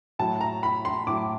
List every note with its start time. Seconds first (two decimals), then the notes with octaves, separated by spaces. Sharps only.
0.19 A2 F#3 A5
0.41 A#5
0.63 B5
0.85 C6
1.07 A2 F#3 D6